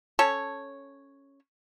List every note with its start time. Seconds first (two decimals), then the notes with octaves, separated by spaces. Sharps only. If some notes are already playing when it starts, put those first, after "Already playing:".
0.19 C#4 A4 C#5